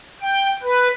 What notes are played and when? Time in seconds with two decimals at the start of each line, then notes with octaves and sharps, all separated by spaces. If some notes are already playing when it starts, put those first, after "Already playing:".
0.22 G5
0.63 B4